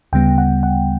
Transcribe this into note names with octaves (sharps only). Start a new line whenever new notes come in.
D2 C#3 G3 B3 G5
F#5
F#5